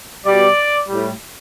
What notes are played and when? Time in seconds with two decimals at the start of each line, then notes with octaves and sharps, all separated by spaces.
0.25 B2 G3 D5
0.88 A2 G3